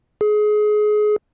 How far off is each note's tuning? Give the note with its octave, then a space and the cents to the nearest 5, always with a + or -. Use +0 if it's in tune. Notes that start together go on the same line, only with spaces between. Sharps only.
G#4 +25